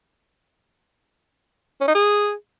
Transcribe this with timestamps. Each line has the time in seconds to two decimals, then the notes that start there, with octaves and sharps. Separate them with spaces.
1.81 C#4
1.88 D#4
1.95 G#4